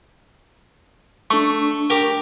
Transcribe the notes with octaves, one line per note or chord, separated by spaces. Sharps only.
A3 D4 C#6
G4 A#4 G5